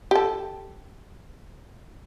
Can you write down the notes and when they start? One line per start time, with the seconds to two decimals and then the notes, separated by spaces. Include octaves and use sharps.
0.11 G4 A4